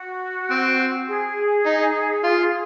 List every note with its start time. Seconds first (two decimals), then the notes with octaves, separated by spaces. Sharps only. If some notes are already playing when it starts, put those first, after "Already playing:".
Already playing: F#4
0.51 C4
1.08 G#4
1.66 D#4
2.24 F4